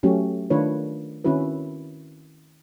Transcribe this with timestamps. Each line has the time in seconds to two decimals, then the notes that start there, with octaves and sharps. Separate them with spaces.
0.03 F#3 A3 C#4 F#4 G4
0.50 D#3 A3 D4 F4 B4 C#5
1.24 D#3 C4 C#4 E4 F#4 B4